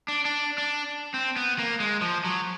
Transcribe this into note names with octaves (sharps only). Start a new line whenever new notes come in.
D4
D4
D4
C4
B3
A#3
G#3
F3
F#3